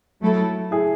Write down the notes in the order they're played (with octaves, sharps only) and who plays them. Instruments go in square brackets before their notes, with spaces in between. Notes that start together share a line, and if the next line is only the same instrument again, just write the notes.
[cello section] F#3 A3 E4 A4
[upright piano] E4 G#4